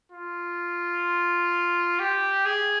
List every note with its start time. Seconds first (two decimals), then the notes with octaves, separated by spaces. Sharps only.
0.12 F4
2.00 G4
2.46 G#4